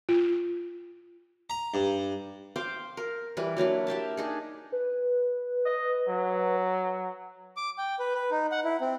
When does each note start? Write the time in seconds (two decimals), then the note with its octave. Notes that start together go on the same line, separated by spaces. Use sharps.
0.09 F4
1.50 A#5
1.74 G2
2.56 C5 F5 G5 D6
2.97 A#4
3.37 E3 G3 B4
3.57 F#3 A#3 D4 E4
3.87 A#3 G4 E5 A5
4.17 D4 D#4 G#4
4.72 B4
5.66 D#5
6.09 F#3
7.57 D6
7.78 G5
7.99 B4
8.15 B4
8.31 D#4
8.52 F#5
8.64 E4
8.81 C4